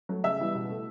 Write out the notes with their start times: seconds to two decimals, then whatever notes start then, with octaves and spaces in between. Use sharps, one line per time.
0.09 F#3 A3
0.24 C#3 E5 E6
0.40 E3 G3 B3
0.55 B2
0.69 A3